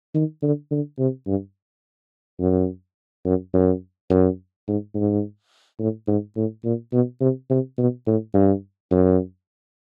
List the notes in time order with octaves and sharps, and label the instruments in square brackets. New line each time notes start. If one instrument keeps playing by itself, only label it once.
[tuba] D#3
D3
D3
C3
G2
F#2
F#2
F#2
F#2
G#2
G#2
A2
G#2
A2
A#2
B2
C3
C3
B2
A2
G2
F#2